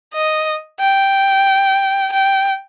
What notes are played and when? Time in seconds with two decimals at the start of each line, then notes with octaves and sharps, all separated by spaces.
0.14 D#5
0.80 G5
2.13 G5